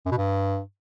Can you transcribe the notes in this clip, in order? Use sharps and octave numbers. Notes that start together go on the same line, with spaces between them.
F#2
B2
G2